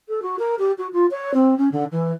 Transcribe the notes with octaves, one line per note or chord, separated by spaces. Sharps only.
A4
F#4
A#4
G4
F#4
F4
C#5
C4
C#4
D3
E3